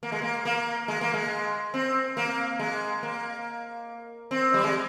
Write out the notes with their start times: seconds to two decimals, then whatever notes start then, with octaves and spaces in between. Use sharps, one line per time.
0.03 A#3
0.12 G#3
0.22 A#3
0.45 A#3
0.88 G#3
1.01 A#3
1.14 G#3
1.74 C4
2.17 A#3
2.59 G#3
3.03 A#3
4.31 C4
4.54 G3
4.64 G#3